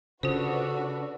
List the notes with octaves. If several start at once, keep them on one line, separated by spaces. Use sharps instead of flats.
C#3 D4 F4 F#4 A4 B4 C5